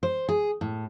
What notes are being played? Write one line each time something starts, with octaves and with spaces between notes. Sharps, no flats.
C5
G#4
A2